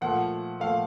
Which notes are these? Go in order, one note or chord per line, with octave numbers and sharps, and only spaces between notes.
A#2 F3 A3 F#5
A#2 F3 A3 F5